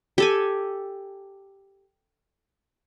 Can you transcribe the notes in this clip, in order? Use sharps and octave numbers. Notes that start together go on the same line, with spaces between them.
G4 A4 G#5